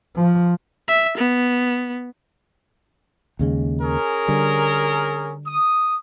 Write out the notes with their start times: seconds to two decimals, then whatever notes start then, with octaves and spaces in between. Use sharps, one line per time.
0.16 F3
0.88 E5
1.18 B3
3.39 D#2 C#3 G#3
3.82 C#4 G#4 A#4
4.28 D3 G3
5.46 D#6